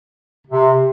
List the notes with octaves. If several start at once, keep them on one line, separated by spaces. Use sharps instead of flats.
C3